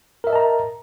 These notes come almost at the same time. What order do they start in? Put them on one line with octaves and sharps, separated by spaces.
A#4 E5 D#5 A5 A#5